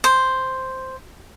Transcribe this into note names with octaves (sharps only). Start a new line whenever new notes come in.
C5